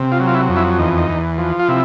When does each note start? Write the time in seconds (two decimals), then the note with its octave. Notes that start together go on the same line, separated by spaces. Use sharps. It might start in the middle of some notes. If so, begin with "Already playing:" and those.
Already playing: C3
0.12 F4
0.20 F#3
0.27 F4
0.35 E4
0.49 F2
0.56 E4
0.79 E2 D#4
0.98 D#4
1.09 E2
1.38 F3
1.59 F4
1.68 C3 E4